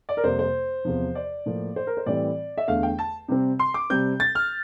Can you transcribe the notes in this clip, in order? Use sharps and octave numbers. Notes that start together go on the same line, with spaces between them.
D5
A#4
F2 C3 G3 A#3 C5
C5
E2 C3 F3
D5
A2 F3 A#3
C5
A#4
C5
A2 E3 G3 C4 D5
E5
E2 D3 A3 F5
G5
A5
C3 G3 C4
C6
D6
C3 G3 C4 G6
A6
F6